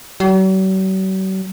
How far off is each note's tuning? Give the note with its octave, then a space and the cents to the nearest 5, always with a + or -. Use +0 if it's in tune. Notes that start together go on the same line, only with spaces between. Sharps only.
F#3 +45